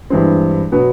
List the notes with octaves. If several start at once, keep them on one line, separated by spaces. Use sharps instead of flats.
G2 E3 G#3 C4
B2 F#3 B3